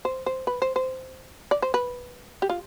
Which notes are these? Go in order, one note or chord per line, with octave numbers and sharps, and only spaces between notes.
C5
C5
B4
C5
C5
D5
C5
B4
G4
F4